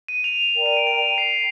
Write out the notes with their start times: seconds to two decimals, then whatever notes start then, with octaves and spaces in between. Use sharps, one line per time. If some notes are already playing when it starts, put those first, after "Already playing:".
0.08 D#7
0.24 F7
0.55 A#4 D5 G5 A#5
0.66 D#7
0.77 D7
0.87 F7
1.02 D#7
1.18 C7